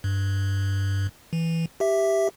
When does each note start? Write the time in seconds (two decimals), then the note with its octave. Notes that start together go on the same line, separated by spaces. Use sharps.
0.04 G2
1.33 E3
1.80 G4 E5